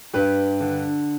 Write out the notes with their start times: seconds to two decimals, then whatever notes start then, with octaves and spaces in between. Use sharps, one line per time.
0.14 G2 G4 B4
0.61 D3